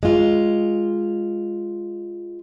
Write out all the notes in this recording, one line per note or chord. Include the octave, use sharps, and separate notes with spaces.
G#3 F4